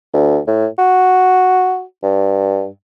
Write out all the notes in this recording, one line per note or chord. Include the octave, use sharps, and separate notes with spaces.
D2
A2
F#4
G2